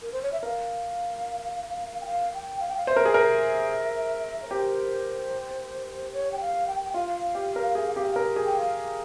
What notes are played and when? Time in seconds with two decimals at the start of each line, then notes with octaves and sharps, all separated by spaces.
0.02 A#4
0.12 C5
0.22 C#5
0.32 E5
0.43 A#4 F5
2.01 G5
2.06 F5
2.34 G5
2.60 F5
2.68 G5
2.77 F5
2.87 C5 E5
2.96 A#4
3.05 G#4
3.14 A#4
4.43 C#5
4.50 G4 C5
6.13 C#5
6.32 G5
6.41 F5
6.67 G5
6.85 G5
6.94 F4 F5
7.35 G4
7.56 A#4
7.75 G#4
7.96 G4
8.16 A#4
8.36 G#4
8.46 G5
8.57 F5